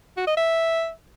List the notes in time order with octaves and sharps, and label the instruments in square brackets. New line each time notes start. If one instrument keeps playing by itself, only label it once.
[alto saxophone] F#4
D#5
E5